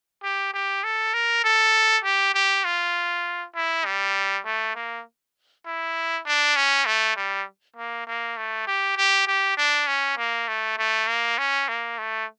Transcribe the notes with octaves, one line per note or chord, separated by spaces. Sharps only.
G4
G4
A4
A#4
A4
G4
G4
F4
E4
G3
A3
A#3
E4
D4
C#4
A3
G3
A#3
A#3
A3
G4
G4
G4
D4
C#4
A#3
A3
A3
A#3
C#4
A#3
A3